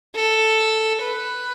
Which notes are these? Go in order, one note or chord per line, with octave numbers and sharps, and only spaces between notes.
A4
B4